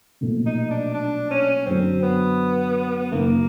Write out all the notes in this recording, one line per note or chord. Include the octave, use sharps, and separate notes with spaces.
B1 A#2 F3 A3
D#4
D4
D4
C#4
F#2 D3 F#3 C4
B3
F#1 F#2 D#3 F#3 A#3